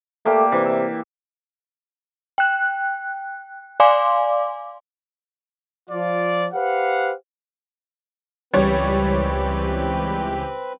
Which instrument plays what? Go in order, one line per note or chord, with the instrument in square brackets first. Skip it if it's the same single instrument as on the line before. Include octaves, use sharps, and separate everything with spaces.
[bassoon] A3 [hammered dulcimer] A#3 G4 D5
[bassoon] C3 [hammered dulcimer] E3
[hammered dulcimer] E5
[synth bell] G5 F#6
D5 F5 G#5 C6 D6
[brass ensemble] F3 F4 D5
G4 B4 C5 F5 F#5
[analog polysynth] C#2 E3 G4 [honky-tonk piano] G3 C#5 [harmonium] C4 B4